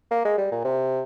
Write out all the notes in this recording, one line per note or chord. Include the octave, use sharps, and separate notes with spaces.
A#3
G#3
G3
A#2
C3